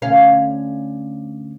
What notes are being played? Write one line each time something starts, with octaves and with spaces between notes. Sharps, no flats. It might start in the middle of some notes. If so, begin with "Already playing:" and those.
D2 C#4 F5